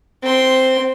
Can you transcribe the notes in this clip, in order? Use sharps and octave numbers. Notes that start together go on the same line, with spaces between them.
C4 C6